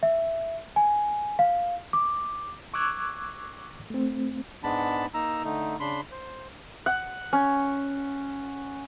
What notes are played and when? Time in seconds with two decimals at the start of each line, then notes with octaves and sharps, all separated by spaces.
0.03 E5
0.76 G#5
1.39 F5
1.93 D6
2.74 C#6 D6 E6 F#6 G#6
3.90 A3 C4
4.63 G#2 G#3 B3 D4 A5 B5
5.14 A#3 D#4 A#5 E6
5.44 D3 A3 D#4
5.80 C#3 D4 B5 C6
6.11 C5
6.86 F#5
7.33 C#4